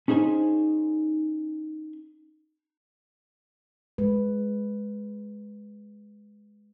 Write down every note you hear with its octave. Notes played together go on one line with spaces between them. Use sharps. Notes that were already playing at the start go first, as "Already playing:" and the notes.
C#4 D#4 G#4 C5 G#5
G#3 B4